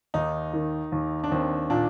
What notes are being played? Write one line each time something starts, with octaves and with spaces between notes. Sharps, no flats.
D#2 D#4
D#3
D#2
D4
D#2 C4
A#2 D4